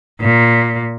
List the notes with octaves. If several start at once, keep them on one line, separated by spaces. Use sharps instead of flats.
A#2